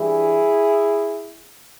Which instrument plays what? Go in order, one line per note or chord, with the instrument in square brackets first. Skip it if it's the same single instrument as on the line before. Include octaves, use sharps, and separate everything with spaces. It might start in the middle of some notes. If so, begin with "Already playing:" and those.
Already playing: [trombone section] G2 E3 G3 E4 G#4